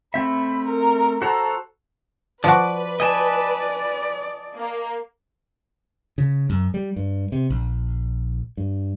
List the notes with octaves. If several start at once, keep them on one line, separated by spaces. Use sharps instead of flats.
A3 C4 E5 B5
A#4
F#4 A4 C5 A#5
F3 F#4 B4 D5 D6
D5 D#5 G#5 A5
A#3
C#3
F#2
G3
G2
C3
A#1
G2